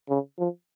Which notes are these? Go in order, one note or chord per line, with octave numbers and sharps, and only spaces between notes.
C#3
F3